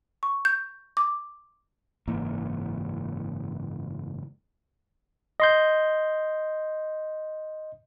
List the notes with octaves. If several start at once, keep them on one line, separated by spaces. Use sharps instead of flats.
C#6
G6
D6
F#1 G#2 E3 A#3
D#5 C6 G6